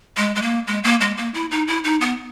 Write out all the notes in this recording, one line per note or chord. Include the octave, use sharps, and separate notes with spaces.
G#3
G#3
A#3
G#3
A#3
G#3
A#3
E4
D#4
E4
D#4
B3